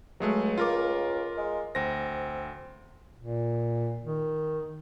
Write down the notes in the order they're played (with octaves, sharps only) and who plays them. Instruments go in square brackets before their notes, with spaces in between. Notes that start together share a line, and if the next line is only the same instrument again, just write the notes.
[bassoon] C#2 [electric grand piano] F#3 G#3 A3
[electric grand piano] F4 A#4 D6
[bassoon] G#3
[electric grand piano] D2 A#6 [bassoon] C4
[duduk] A#2
D#3